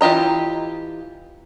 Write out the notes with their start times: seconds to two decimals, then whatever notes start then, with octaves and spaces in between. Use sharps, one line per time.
0.01 E3 F4 G4 D#5 A#5